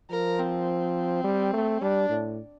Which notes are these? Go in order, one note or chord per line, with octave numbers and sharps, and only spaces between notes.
F3 A#4
C4
G3
A3
G3 D4
A2